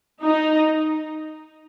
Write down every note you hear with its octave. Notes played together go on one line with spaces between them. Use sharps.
D#4